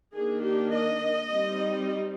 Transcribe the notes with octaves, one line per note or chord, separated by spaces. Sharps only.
D#3 A#3 D4 G#4
G4
D#5
G3 C4 D#4